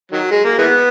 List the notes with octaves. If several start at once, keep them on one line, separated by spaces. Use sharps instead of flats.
D#3 F#3
G#3
A#3
E3 G#3 B3